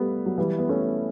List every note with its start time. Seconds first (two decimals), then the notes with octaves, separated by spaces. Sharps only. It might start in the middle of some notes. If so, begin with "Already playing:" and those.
Already playing: G3 A3 B3
0.26 F#3
0.38 E3 G3
0.58 B3
0.69 A3 C#4